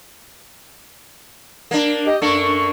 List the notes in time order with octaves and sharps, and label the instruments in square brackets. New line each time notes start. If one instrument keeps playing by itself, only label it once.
[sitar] A#3 D4
[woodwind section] G4 D#5
[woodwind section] F#2 A4 C#6 [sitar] A#3 D4